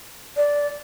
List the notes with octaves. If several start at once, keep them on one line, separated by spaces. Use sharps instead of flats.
D5